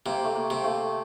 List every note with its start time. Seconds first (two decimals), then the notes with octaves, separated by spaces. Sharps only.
0.06 C3 A#3
0.24 A3
0.36 A#3
0.50 C3
0.64 A3